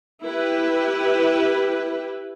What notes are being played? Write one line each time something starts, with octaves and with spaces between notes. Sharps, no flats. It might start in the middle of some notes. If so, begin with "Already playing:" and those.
E4 G4 B4